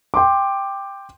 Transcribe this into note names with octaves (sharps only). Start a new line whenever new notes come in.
G5 C6 D6